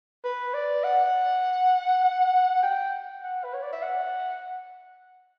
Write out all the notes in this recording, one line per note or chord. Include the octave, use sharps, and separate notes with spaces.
B4
D5
F#5
G5
F#5
B4
C#5
D5
E5
F#5